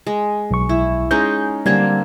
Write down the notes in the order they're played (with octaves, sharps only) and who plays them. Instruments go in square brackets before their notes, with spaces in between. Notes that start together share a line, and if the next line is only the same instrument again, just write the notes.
[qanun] G#3
[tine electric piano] B1 C#6
[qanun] E4
[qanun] G#3 C#4 D#4 [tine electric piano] G6
[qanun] D3 A#3 C4 [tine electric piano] G3 G#6